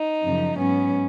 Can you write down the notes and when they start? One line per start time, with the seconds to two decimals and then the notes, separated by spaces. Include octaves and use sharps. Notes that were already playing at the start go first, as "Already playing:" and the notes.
Already playing: D#4
0.23 F#2 C#3 F3
0.58 G#2 F#3 B3 C#4